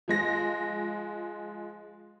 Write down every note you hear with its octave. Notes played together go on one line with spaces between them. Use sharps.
F3 G#3 A#6